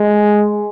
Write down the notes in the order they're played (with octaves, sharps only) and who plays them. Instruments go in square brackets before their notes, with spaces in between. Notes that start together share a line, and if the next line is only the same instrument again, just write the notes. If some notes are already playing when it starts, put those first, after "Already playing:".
Already playing: [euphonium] G#3